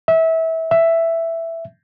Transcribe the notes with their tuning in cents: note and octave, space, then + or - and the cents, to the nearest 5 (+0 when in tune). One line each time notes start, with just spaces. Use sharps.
E5 -25
E5 +5